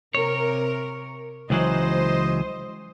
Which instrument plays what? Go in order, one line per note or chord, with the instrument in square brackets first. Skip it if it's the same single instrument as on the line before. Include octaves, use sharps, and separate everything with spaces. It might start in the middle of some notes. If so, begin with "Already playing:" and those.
[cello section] C3 A#4 [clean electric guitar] C#5
[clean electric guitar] C#2 E3 F#3 [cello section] C5 D#5